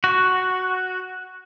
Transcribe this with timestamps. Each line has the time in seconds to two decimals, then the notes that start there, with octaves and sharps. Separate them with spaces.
0.04 F#4